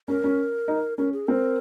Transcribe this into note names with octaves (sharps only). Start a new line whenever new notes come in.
C#4 A#4
C#4
D#4
C#4 A#4
G#4
C4 A#4